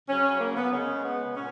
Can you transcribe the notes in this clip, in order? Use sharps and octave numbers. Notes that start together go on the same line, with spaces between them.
C#3 F#3 C#4
A#3
B3
C#3 G#3 C#4
B3
A#2 C#4